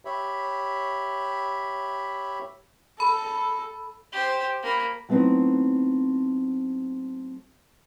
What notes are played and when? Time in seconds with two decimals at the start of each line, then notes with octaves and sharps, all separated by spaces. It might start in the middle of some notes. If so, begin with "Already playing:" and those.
0.05 G4 C#5 E5 B5
3.00 A4 B5
4.12 G4 C5
4.63 A#3 B5
5.09 F#3 A3 B3 C4 D#4 E4